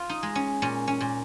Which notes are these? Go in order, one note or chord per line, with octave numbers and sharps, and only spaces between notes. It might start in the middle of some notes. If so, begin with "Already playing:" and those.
Already playing: F4
D#4
G#3
C#4
A#2 C#4
C#4
A#2